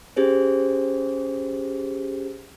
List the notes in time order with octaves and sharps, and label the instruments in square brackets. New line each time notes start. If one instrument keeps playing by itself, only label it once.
[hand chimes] C#4 G4 G#4 C5